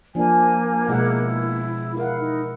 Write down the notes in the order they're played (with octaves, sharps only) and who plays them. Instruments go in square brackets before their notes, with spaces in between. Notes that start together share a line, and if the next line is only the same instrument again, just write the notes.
[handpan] F3 D4 [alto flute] A#3 [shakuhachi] G#5
[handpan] B2 G#3 F#5 [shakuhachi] E4
[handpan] E4 F#5 [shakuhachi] A#4 [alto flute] F5
[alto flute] D#4